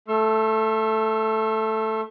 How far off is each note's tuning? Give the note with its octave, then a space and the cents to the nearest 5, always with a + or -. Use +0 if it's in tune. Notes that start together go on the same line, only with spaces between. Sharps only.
A3 +0 C#6 -40 E6 +30